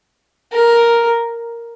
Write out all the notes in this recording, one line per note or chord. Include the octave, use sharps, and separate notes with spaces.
A#4